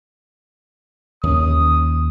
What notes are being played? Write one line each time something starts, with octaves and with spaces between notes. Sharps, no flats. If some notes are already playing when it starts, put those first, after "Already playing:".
D#2 C#4 D#6